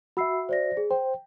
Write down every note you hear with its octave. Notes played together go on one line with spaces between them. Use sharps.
F#4 E5 B5 E6 C7
C5 D5 A#6
G#4
C5 G5